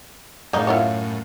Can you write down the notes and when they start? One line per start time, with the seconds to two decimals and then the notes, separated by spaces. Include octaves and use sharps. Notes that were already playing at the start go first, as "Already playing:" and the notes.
0.53 F#2 A2 C#3 D#4
0.67 E4 F4 C#5